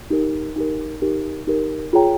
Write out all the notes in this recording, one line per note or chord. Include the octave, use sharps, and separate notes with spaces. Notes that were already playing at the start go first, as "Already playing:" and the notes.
D#4 G4 A#4
D#4 G4 A#4
D#4 G4 A#4
D#4 G4 A#4
F4 G#4 C#5 G5 A#5